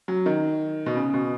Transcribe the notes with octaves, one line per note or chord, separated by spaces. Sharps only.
F#3
D#3
B2
C#3
B2